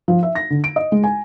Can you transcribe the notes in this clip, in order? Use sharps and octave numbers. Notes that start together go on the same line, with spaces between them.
F3
E5
A#6
D3
D7
D#5
G#3
G#5